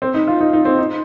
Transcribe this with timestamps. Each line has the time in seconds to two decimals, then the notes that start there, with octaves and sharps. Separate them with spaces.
0.02 C4
0.14 D#4
0.27 F4
0.41 D#4
0.53 D#4
0.65 C4
0.78 D#4